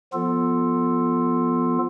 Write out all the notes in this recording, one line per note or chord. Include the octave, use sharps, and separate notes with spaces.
F3 B3 F4 A4